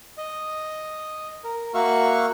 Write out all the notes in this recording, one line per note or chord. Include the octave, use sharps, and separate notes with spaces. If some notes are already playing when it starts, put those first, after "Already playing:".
D#5
A#4
A#3 F#4 E5 F5 C#6